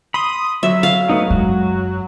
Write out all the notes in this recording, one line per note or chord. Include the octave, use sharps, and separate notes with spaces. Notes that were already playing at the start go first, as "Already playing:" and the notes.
B5 C6 D#6
F#3 E5
F5
A3 B3 D#4
F#2 G#3 F#4